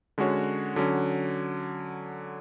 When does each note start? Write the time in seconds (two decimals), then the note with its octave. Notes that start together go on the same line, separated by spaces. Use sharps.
0.18 D3 G#3 C#4 F#4 C#5
0.76 D3 F#3 C#4